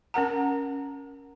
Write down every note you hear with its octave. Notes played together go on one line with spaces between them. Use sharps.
C#4 A#4 F#5 A#5